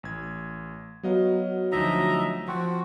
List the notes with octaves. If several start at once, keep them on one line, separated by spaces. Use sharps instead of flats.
A1 G#6
F#3 B3 D#5 F5
D2 F3 D#4 D#5 E5 A#5
F3 C4 F#4